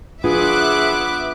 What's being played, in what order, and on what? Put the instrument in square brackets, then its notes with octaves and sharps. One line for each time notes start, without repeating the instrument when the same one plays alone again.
[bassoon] B3 [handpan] D4 F4 [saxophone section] G#4 [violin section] E5 D6 F#6